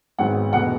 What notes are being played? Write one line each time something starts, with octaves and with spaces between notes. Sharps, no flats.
G#1 G#2 F#3 B3 F#5
E1 B2 A3 F#5